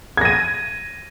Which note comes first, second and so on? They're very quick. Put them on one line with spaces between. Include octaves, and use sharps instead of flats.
G#6 A#6 D#7